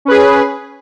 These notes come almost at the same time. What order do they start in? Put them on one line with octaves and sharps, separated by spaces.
C#4 B4 G#4